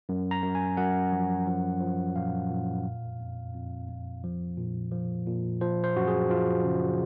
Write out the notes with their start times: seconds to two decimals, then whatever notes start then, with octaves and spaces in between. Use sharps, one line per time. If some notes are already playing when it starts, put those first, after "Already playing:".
0.09 F#2
0.31 A#5
0.43 F#2
0.55 G#5
0.77 F#2 F#5
1.12 F3
1.47 F3
1.81 F3
2.16 A#2 F5
2.50 A#2
2.84 F2
3.19 F2
3.54 F2
3.88 F2
4.24 F3
4.58 A#2
4.92 F3
5.26 A#2
5.61 F3 C5
5.84 C5
5.96 F#2 F#4
6.07 G#4
6.30 F3 F4
6.64 C#3